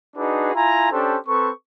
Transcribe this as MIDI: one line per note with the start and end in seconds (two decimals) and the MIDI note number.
0.17 0.54 62
0.17 0.54 63
0.17 0.54 66
0.17 0.54 68
0.17 0.54 71
0.54 0.89 64
0.54 0.89 65
0.54 0.89 80
0.54 0.89 82
0.92 1.17 61
0.92 1.17 62
0.92 1.17 67
0.92 1.17 69
0.92 1.17 72
1.27 1.51 60
1.27 1.51 69
1.27 1.51 71
1.27 1.51 85